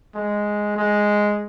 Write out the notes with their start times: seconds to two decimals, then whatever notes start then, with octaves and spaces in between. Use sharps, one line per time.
0.15 G#3
0.77 G#3